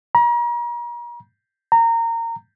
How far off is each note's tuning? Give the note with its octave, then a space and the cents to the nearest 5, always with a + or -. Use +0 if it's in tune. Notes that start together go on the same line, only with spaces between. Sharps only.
A#5 +40
A#5 -20